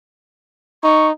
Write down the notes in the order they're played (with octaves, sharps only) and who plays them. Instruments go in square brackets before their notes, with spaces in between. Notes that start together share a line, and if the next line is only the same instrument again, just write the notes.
[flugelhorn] D#4 [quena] C#6